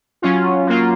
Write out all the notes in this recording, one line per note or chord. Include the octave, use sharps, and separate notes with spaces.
F#3 C#4 F4
F#3 A#3 F4